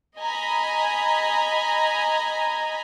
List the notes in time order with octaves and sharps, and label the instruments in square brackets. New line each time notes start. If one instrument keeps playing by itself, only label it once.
[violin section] D#5 G#5 A#5 B5